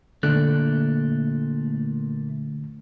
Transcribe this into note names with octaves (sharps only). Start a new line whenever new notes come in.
A#2 D3 A3 F#6